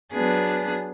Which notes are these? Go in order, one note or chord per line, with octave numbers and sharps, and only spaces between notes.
F#3 B3 D4 G#4